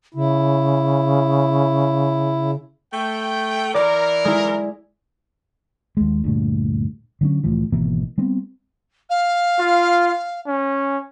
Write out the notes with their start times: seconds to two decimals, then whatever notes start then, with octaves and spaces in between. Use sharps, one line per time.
0.14 C#3 E4
2.94 A3 G5
3.74 E3 A#4 D5
4.25 G#3 E4
5.97 D#2 G#3
6.24 D2 G2 A#2
7.21 D3 F#3 C#4
7.44 C2 A2 E3 F3
7.72 G#1 B2 E3 A#3
8.18 G3 B3 C4
9.09 F5
9.59 F4
10.47 C#4